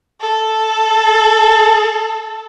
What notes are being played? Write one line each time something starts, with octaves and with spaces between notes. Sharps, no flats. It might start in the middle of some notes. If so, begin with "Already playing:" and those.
A4